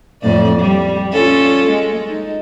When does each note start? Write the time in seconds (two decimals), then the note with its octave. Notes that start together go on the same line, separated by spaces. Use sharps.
0.22 F2 A2 D5
0.60 G3
1.13 C#4 F4 A4
1.69 G#3
2.08 D#4